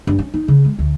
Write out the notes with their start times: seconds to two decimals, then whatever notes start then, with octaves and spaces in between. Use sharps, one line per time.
0.07 G2
0.19 C#4
0.34 D#4
0.48 C#3
0.65 G#3
0.79 D2